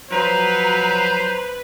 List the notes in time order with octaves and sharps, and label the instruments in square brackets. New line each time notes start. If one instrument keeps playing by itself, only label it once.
[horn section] F3 F#3 [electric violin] B4 [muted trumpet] C5 [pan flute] A#5